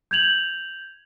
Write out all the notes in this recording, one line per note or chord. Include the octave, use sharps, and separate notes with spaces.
G6 G#6 F7 F#7